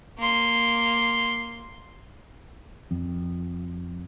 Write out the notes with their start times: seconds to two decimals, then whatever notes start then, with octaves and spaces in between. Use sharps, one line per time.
0.19 A#3 C6
2.91 F2